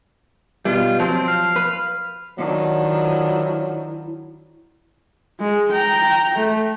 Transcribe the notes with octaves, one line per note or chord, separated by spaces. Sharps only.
B2 G3 F4
F3 F#3 C4
F5
B4
D#3 F3 F#3 D4 E4
G#3
G5 A#5
A3